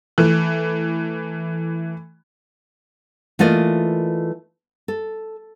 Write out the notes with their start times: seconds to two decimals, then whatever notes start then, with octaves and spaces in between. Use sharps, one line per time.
0.18 E3 A3
3.39 E3 A3 A#3 F4 D5 D#5
4.88 A4